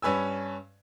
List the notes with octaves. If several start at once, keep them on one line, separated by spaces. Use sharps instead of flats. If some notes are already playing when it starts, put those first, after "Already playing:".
G2 C#4 B4 G#5 E6